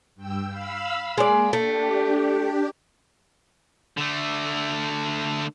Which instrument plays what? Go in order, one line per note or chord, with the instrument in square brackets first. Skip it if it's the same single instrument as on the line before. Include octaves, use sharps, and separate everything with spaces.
[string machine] G2 G5 E6
F5 B5 E6
[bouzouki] G#3 D5 [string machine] A#3
[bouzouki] A3 [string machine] D4 G4
[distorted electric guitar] D3 A3